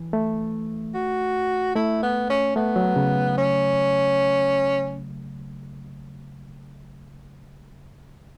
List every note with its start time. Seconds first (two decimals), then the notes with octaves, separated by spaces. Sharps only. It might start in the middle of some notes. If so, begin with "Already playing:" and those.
Already playing: E3
0.13 A3
0.94 F#4
1.75 A3 E4
2.03 B3
2.30 C#4
2.56 A3 B3
2.76 F#3
2.96 C#3
3.37 C#4